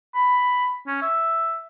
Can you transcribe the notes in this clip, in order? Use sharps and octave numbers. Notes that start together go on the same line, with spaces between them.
B5
C#4
E5